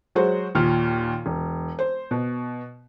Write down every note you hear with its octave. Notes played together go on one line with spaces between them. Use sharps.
F#3 G#3 F#4 C5
D#2 A#2 F6
E1
C5
B2